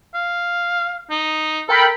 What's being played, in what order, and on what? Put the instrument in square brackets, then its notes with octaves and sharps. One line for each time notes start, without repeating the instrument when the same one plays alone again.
[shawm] F5
D#4
[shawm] A4 [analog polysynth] A#4 G5 B5